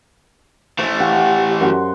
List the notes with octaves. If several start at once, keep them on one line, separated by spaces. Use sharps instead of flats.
E3 A3 C5 E5
G4 F5 F#5
F#2 F#4 C6